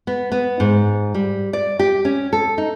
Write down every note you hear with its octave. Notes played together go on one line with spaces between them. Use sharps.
B3
B3
G#2
G3
D5
G4
C#4
A4
D#4